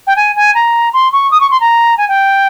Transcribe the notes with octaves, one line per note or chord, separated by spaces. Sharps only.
G5
G#5
G#5
A#5
C6
C#6
D#6
C#6
C6
A#5
G#5
G5